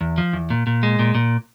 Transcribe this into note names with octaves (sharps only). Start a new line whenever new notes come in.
E2
F3
E2
A#2
A#2
G#3
A#2
A#2